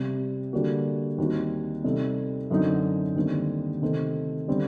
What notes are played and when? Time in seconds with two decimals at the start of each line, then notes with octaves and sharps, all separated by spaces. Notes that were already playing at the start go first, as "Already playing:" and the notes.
Already playing: C3 G3 C4
0.53 D3 G3 A#3 F#4
1.18 D#2 D#3 G3 C4 F#4
1.84 C3 G3 C4 D#4 A4
2.51 F#2 D3 F#3 C4 D#4
3.16 D#2 D3 G3 C4
3.82 C3 D#3 A3 C4
4.48 D3 G3 C4